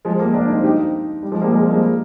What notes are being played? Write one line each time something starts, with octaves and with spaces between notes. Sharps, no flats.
F3 G#3
G3 A#3
A#3 D4
C4 D#4
D#4 G4
G3
F3 G#3
G3 A#3
F3 G#3
G#3 C4
G3 A#3